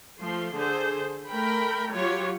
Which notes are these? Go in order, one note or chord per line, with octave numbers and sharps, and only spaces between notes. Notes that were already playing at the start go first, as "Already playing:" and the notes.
F3 A3 C6
D3 G#4 A4 C5
A3 A#4 G5 B5
F#3 F4 G4 C#5